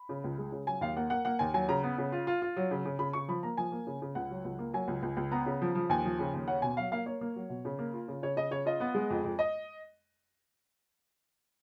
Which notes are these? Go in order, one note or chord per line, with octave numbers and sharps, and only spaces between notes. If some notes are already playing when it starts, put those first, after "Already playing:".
Already playing: B5
C#3
C#2
G#3
C#3
F#3 G#5
D#2 F5
A#3 F#5
A#3 F#5
A#3 F#5
D#2 G#5
F#3 G#5
C#3 A#5
B3
C#3
F4
F4
F4
F#3
C#3
C#3
C#3 B5
C#3 C#6
F3 B5
A#3 A#5
F3 G#5
A#3
C#3
C#3
C#2 F#5
F#3
C#2
A#3
F#3 G#5
C#2
C#2
C#2
B3 A#5
C#3
F3
F3
D#2 G#5
F3
C#3
D#2
C#4 F#5
B2 G#5
F#3 F5
A#3 F5
A#3 C#5
A#3
F#3
B2
C#3
A#3
F4
C#3
C#3 C#5
C#3 D#5
C#3 C#5
F4 D#5
B3
G#3
F2
F2
D#5